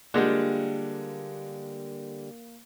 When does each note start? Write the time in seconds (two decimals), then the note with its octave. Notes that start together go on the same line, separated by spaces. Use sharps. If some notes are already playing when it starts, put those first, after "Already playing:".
0.14 D3 G3 G#3 A#3 D4 F4 G4 F#5